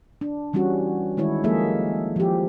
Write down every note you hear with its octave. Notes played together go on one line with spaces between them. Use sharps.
D4
E3 G3 C#4 D4 F#4
D#3 G#3 E4 C#5
F3 G#3 A#3 G#4 A4 E5
F3 G4